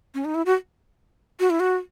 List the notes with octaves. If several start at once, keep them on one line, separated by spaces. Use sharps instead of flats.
C#4
D#4
E4
F#4
F#4
E4
F#4